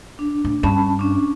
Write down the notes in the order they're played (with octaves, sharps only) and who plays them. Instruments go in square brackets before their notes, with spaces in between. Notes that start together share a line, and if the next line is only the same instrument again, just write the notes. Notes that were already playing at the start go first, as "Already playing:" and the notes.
[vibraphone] D4
[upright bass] A2
[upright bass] G2 [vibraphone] C#4 A5 B5
[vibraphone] C#4 D4